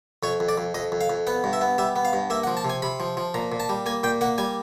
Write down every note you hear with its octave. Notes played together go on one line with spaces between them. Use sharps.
F2 C#5
F2
D5
F2
F2 D#5
F2
F5
F2
B3 F#5
G2
E5
B3
G3 E5
B3
F5
G2
A#3 E5
F#5
F3
A5
C3
G#5
C3 B5
F3
F3
A#2 A#5
A#2
A5
G3
A#3 G#5
A#2 G5
A#3 F#5
G3 G#5